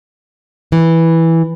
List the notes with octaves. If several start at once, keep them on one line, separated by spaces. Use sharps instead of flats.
E3